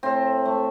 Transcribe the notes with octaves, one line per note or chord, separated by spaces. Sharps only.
A2 C4
A3